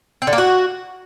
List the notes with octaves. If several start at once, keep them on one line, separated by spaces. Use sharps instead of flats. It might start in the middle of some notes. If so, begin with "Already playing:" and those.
C4
D3
A#3
F#4